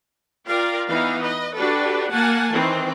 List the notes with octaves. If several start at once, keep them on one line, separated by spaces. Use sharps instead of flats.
F4 A#4 D5 F5 G5
E3 B3 D#4 E4 F5
B4 D#5
D4 F#4 G4 A4 B4
A#3 F#5 G#5 A5
D#3 E3 C4